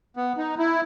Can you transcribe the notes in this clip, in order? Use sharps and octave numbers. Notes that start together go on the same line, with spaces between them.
B3
D#4
E4